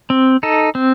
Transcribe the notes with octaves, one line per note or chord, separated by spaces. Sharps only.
C4
D#4 A4
C4